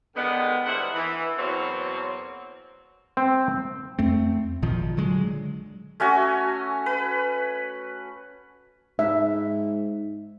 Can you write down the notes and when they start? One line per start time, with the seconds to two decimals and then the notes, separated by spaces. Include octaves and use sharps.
0.16 D3 D#3 G#3 B3
0.66 G2 A#3 E4 C5 F#5
0.95 E3
1.37 E2 B2 F#3 A#3 C4 C#5
3.17 C4
3.99 F2 A3 C4
4.62 G#1 A#2 D#3 F3
4.97 D3 F#3 G#3
6.00 A3 C#4 F#4 G#5
6.86 B4
8.99 G#2 E5